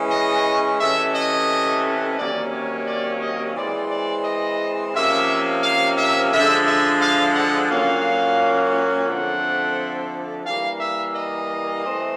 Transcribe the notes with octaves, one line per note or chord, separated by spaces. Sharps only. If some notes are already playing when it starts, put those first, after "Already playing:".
Already playing: E3 G#3 C#4
D#5
C3 E3 A3 C#4 E5
D#5
C3 D#3 F#3 A#3 C#4 D5
C#5
D5
D#5
E3 G#3 C4 D5
D5
D#5
C3 F3 A#3 C#4 E5
F5
E5
D3 F3 G#3 E5
E5
F5
F#5
A#2 F#3 A#3 C#4 F5
D3 F3 A3 C4 F#5
E3 G3 A#3 F5
E5
D#5
E3 A3 C4